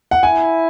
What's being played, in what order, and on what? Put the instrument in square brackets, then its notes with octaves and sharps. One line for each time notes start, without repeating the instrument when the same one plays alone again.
[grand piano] F#5
[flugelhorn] E4 [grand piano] G#5